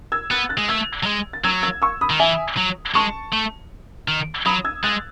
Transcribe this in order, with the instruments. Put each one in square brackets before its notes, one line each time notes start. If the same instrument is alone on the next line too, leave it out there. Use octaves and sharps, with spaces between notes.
[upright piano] E6 G#6
[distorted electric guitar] B3 [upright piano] F#6 A6
[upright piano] F#6 A6
[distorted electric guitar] G#3
[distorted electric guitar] A3 [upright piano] E6 G#6
[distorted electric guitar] F#3
G#3
[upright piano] A6
[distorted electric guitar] F#3 [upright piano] E6 G#6
[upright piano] E6 G#6
C#6 E6
B5 D#6
[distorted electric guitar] D#3
[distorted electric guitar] E3 [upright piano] E5 G#5
[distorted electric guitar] F#3
[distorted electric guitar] G#3 [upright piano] A5 C#6
[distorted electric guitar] A3
D#3
[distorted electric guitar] F#3 [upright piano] B5 D#6
[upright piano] E6 G#6
[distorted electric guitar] G#3 [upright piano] F#6 A6